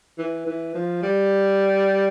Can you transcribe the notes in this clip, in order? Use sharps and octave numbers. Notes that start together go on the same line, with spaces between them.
E3
E3
F3
G3